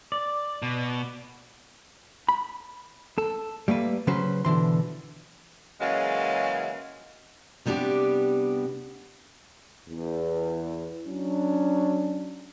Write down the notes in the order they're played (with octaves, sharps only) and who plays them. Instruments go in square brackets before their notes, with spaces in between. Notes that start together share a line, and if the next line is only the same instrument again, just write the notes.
[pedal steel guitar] D5
[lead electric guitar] B2
[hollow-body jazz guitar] B5
A4
G3 A3 A#3 B4
C#3 F#3 C#4 B4 C5
B2 D3 E3 C6
[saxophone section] C#3 E3 F#3 G#3 A#3
[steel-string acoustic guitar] C3 G3 B3 D4 F#4 G4
[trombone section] E2
F#3 C#4 D4